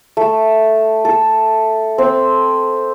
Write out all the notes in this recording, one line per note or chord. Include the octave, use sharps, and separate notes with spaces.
A3
A4
C4